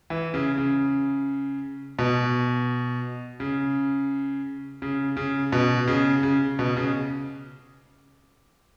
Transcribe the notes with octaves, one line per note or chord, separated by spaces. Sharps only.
E3
C#3
C#3
B2
C#3
C#3
C#3
B2
C#3
C#3
B2
C#3